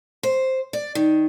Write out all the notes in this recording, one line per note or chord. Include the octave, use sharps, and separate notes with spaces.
C5
D5
D#3